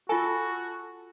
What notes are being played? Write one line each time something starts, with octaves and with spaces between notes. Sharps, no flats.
F4 F#4 A4 G#5